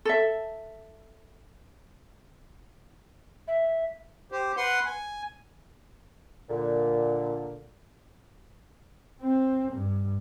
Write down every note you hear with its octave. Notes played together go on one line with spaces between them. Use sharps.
A4 E5
E5
G4 C5
B4 F#5 C6
G#5
A#2 D3
C4
G2